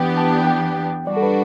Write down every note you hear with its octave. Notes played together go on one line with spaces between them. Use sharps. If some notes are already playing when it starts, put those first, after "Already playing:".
Already playing: E3 B3 D4 G4 G5
A5
G5
G3 D4 F#4 D5
A4
B4